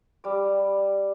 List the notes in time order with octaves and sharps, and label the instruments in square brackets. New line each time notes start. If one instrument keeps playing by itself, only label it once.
[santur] G3 D6